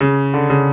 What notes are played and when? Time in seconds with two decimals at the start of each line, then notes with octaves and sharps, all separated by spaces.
0.01 C#3
0.34 D3
0.50 C#3